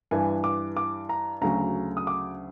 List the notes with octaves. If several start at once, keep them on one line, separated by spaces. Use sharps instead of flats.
G2 E3 G#5
D6
D6
A#5
D2 C#3 F#3 A#5
D#6
D6